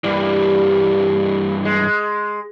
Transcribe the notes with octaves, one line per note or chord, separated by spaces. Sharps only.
G2 E3 G3 A#3
G#3